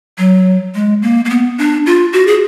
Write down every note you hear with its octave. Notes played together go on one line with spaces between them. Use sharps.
F#3
G#3
A#3
A#3
B3
D4
F4
F#4
G#4